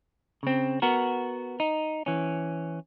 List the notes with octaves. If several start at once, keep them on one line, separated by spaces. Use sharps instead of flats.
C#3 C4
B3 F#4 A#4
D#4
E3 C#4